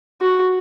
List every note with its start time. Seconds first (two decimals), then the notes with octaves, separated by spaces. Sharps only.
0.21 F#4